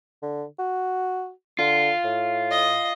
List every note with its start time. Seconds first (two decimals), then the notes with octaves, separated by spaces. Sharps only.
0.23 D3
0.59 F#4
1.59 D3 F4
2.04 A2
2.51 D#5